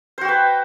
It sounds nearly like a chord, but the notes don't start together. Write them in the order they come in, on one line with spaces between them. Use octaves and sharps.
C5 F#4 G5 B4